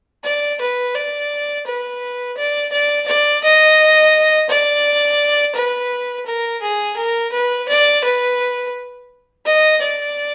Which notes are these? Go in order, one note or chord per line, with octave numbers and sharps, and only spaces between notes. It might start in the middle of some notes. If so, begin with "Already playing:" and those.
D5
B4
D5
B4
D5
D5
D5
D#5
D5
B4
A#4
G#4
A#4
B4
D5
B4
D#5
D5